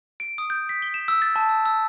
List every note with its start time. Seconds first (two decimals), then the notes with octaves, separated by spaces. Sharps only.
0.20 D7
0.38 D#6
0.50 G6
0.69 B6
0.82 G7
0.94 E7
1.08 E6
1.22 A6
1.36 A5
1.49 E6
1.66 E6